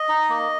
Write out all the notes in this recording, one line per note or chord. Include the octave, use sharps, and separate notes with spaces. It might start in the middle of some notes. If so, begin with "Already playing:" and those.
Already playing: D#5
D#4
A#3